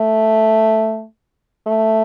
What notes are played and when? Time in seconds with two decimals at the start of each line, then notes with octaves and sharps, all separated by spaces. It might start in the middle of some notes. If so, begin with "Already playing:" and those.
Already playing: A3
1.66 A3